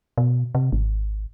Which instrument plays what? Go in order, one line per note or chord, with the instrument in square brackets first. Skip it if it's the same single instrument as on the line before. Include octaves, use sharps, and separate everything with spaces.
[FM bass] B2
C3
G#1